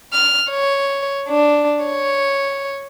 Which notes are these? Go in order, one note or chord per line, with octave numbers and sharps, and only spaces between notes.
F6
C#5
D4
C#5